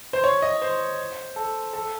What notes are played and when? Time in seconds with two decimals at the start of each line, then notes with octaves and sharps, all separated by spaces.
0.13 C5
0.24 C#5
0.42 D#5
0.62 C5
1.36 A4
1.73 A4